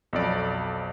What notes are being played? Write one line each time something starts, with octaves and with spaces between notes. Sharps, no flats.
B1 F2 D5